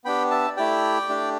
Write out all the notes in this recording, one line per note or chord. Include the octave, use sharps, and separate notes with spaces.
B3 D4 G4 G5 B5
E5 A5
A3 E4 G4 D5 G5
A3 D4 G4